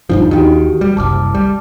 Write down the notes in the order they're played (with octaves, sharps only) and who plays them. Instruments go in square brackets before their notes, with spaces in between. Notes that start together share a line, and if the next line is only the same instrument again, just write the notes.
[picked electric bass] D#1 G2 F3 [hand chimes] D4 D#4 F4
[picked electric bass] D#2 D#3 [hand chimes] F#4 G4 G5
[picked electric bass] G3
[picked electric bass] F#1 C2 [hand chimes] A5 D6 F6
[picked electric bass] G3